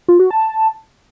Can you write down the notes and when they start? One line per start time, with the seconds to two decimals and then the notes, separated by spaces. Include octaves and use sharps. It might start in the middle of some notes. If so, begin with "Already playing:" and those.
0.08 F4
0.20 F#4
0.31 A5